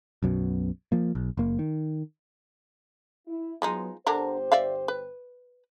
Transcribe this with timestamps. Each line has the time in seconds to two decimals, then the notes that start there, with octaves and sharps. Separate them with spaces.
0.23 B1 F#2 B2
0.92 F3 A#3
1.15 B1
1.37 F#1 A#3
1.59 D#3
3.28 E4
3.62 F3 F#3 G#3 B3 D#4
4.07 G1 D3 D4 G4 A#4 C5
4.52 D5 E5 F5
4.88 B4